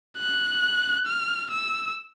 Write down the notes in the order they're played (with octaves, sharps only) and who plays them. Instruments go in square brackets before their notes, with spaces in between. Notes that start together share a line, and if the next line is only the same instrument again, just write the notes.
[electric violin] F#6
F6
E6